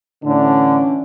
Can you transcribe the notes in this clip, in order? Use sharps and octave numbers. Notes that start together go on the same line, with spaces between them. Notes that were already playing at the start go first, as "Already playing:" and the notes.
A2 D3 E3 C#4 D4